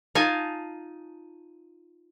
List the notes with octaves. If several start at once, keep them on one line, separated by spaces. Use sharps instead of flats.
D#4 F4 G#5 A5